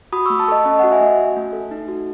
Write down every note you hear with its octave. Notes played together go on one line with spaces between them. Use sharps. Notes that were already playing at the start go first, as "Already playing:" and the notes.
F#4 B5 D#6
C#6 E6
A3
A5 C#6
A4 D#5
C#4 D#5
D#5 F#5
F#4
E5 G#5
A3
F#4
A3
A4
D#4
F#4